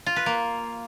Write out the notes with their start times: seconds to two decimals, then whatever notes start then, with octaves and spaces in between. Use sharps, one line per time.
0.06 F4
0.16 B4
0.26 A#3